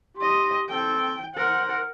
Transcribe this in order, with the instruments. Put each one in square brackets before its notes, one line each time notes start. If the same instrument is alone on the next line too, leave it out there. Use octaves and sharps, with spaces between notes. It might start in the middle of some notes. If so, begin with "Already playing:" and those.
[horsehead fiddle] G4 D#5 [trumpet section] C6
[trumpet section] C4 A4 [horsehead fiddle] G5
[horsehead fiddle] A#4 F#5 [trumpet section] C5